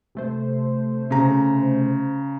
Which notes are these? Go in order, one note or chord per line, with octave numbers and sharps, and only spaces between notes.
C3 A3 C5
C#3 A#5